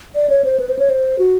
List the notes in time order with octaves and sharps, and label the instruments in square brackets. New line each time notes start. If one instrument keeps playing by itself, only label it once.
[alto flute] D5
C#5
C5
B4
C5
C#5
C5
F#4